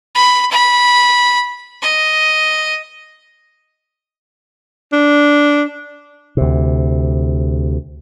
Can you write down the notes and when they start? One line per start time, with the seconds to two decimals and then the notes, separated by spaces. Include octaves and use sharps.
0.15 B5
0.51 B5
1.82 D#5
4.92 D4
6.37 D2 C3